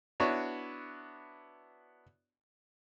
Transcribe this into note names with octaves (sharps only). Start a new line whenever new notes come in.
B3 D4 E4 F#4 C#5